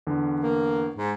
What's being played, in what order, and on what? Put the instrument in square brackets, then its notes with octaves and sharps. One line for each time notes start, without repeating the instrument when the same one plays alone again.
[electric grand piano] E2 D3
[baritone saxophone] A#3
G#2